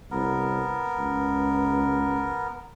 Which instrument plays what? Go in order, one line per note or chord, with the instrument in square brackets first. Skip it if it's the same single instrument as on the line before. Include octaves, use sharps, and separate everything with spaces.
[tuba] C2 [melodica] B3 A#4
[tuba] C#2